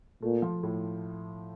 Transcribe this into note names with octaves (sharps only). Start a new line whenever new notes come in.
A#2 A3
F3
A2